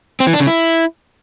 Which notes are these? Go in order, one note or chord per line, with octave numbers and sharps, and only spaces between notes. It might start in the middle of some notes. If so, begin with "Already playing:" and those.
C4
E3
D4
C#3
E4